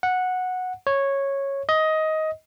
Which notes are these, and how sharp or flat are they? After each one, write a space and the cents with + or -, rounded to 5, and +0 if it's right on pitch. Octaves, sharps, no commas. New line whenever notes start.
F#5 -10
C#5 -10
D#5 +15